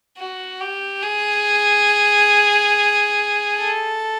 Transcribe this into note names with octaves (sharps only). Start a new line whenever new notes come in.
F#4
G4
G#4
A4